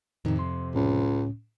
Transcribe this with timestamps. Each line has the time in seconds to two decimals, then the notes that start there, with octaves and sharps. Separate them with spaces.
0.25 F2 A2 C3 D#3 D#4
0.39 C6
0.75 C#2 A2 C#4